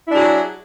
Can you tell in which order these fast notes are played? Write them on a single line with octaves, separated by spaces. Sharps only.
E4 D4 G#4 F#3